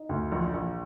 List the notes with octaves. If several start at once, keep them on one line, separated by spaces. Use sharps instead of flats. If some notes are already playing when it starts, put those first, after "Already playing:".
Already playing: D#4
D2
A#1
A#1